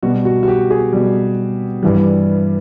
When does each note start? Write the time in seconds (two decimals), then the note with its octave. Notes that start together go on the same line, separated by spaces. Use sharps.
0.03 B2 G3 F#4
0.25 F#4
0.43 F#4
0.48 G4
0.70 G#4
0.93 B2 G3
1.83 G2 E3 G3